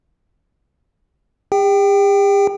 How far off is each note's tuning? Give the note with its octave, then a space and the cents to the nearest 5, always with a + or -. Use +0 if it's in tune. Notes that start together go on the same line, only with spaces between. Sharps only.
G4 +45 G5 -5